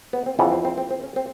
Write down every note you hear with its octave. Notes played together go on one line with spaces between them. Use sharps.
B3
C4
F2 C#3 E3 B3
C4
C4
C4
C4
C#4
C4